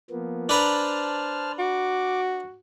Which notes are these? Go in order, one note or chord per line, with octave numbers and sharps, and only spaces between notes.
F3 A#3 B3
D4 B4 C5 A5 A#5 F6
F#4 D6